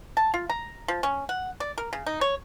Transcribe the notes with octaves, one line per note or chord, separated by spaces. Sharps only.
A5
F4
A#5
F3
C#4
F#5
D5
A#4
C#3
D#4
C#5